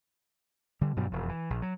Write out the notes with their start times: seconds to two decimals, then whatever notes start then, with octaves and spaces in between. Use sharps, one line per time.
0.81 D3 G3
0.96 G2 B2 F#3 G3
1.12 E1 F2
1.29 E3
1.50 A#1
1.62 F#3